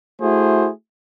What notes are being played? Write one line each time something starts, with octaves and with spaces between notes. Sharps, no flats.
A3 E4 F#4 G#4 C5